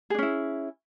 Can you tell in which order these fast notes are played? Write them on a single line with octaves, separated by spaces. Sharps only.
G#4 D4 C#4 E4